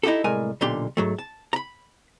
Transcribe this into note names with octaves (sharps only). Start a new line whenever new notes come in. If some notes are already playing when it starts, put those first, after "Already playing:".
D#4 E4 F#4 G4 A4
C2 A2 G#3 A#4 G#5
B1 A#2 D3 G4 C6
G#2 F#3 A3
A5
A#5 B5